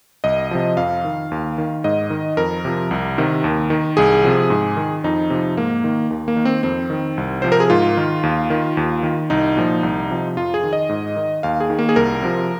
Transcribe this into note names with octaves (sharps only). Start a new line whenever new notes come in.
C2 D#5
C3 F3
F2 F5
D#3
D#2
D#3
G#2 D#5
D#3
F2 A#4
C3 F3
C2
C3 D#3
D#2
D#3
C2 G#4
C3 F3
G#2
D#3
F2 D#4
C3 F3
G#2 A#3
D#3
D#2
A#3
D#3
C4
F2 C4
D#3
C2
C3 F3 C5
A#4
G#4
G#2 F4
D#3
D#2
D#3
D#2
D#3
C2 D#4
A#2 F3
C2
C3 F3
F2 F4
G#4
D#3
D#5
G#2
D#3
D#2 F5
G#4
D#3
A#3
G#4
C2 A#4
C3 F3